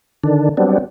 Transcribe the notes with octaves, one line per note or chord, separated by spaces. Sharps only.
D3 D#3 D4
F#3 G3 B3 C4 D4